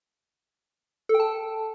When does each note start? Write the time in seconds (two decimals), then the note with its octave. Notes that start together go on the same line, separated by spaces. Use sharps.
1.09 A4
1.14 G5
1.20 A5